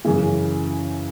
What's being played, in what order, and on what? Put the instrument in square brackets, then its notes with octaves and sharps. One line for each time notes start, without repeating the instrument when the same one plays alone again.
[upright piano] F#2 C#3 E3